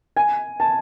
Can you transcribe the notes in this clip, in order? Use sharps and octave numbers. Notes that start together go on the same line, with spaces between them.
G#5
A5